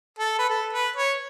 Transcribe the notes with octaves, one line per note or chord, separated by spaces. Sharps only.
A4
B4
A4
B4
C#5